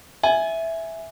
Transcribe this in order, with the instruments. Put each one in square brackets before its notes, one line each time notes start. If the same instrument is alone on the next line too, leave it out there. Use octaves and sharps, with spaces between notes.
[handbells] E5 [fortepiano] G#5